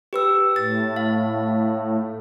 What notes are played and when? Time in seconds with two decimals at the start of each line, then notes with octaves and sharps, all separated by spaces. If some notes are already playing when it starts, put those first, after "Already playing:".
0.13 G4 B4 E6
0.56 A2 A6
0.96 F5